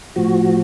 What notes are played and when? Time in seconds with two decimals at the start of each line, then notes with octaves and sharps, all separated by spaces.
0.16 A2 F3 F#4